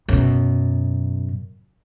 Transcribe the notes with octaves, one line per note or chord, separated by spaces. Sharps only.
F#2 B2